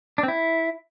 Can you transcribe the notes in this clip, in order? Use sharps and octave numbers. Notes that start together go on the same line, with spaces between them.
D4
C4
E4